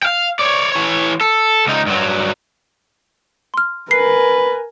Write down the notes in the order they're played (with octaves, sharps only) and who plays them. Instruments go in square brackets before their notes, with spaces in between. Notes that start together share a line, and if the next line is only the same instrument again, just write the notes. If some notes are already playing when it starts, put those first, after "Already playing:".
[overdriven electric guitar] F5 G5
C#5 D5
E3 C#5
A4
C#2 D#4
G2 F#3
[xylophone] C6 F6
[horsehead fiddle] A#4 G#5 [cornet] B4 [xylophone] C7